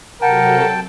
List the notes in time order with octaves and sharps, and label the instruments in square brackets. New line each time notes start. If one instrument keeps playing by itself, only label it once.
[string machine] C3 F#3 A4 [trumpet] A#4 [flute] F#5 [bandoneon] G5 A5